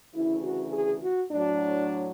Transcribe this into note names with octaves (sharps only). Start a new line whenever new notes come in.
D2 C#3 E3 E4
F#4
G#4
F#4
A2 F#3 D4